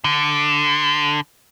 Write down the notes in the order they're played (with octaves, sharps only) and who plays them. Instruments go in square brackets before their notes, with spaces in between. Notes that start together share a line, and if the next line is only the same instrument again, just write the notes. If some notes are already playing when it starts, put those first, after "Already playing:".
[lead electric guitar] D3